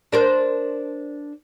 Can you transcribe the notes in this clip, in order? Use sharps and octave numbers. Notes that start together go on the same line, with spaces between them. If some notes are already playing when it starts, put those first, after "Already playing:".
D4 A#4 C5